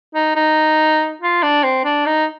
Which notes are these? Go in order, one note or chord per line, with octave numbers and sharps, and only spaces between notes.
D#4
D#4
F4
D4
C4
D4
D#4